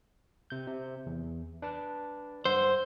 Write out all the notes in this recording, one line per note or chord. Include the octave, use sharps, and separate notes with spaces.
C3 G6
C3
E2
D4 B4 A5
G2 C5 F#5 E6